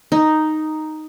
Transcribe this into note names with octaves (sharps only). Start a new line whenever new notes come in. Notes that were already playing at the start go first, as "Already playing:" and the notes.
D#4